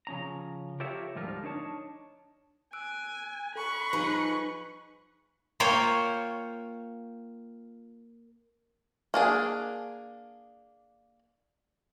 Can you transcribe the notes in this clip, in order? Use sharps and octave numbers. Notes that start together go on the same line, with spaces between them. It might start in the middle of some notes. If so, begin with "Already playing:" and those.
C#3 F3 C#4 A#5
F4 G4 A4 A#4 C#5 E5
D2 G#2 F3 G3 F4 A#4
D4 D#4 C#5 A5
G#5 E6 F#6 D7
A4 B5 C#6 F#6
F3 D#4 G#4 B4
A#3 F4 C5 C#5 G5
A#3 D4 G#4